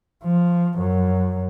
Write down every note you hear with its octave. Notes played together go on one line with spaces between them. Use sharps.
F3
F#2